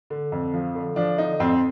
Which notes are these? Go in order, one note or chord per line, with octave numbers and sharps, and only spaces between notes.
D3
F2
F3
D3
F3 D4
D3 D#4
F2 C4